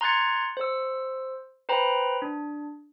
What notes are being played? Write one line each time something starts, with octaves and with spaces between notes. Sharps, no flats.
A#5 C6 F#6 G#6 A6 C#7
C5 E6
B4 C5 G5 A#5 B5
D4